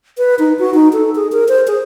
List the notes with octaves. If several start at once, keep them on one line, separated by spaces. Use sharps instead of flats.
B4
D#4
F#4
D#4
A4
G#4
A#4
C5
G#4